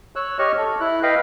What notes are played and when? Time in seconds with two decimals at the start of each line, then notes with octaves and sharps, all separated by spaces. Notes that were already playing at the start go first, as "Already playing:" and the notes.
0.16 C#5 E6 F#6
0.39 G4 C#5 D#5 C#6 F6
0.57 A4
0.80 E4 F#6
1.03 B4 D#5 F5 G5